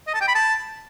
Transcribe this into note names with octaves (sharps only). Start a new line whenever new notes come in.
D#5
A5
G5
B5
A5